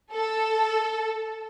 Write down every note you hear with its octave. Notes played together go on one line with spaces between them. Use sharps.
A4